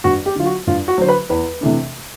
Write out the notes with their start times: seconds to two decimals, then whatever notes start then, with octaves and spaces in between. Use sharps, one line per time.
0.04 G2 F#4
0.26 G4
0.36 D3 F#3 F4
0.46 F#4
0.67 G2 F4
0.88 F#4
0.98 D3 F#3 C5
1.09 B4
1.29 E2 B4
1.61 C3 E3 A3 D4